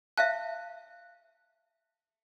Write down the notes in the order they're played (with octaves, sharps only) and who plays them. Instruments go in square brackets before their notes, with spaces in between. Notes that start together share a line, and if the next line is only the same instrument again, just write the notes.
[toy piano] E5 F5 A5 [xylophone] F#6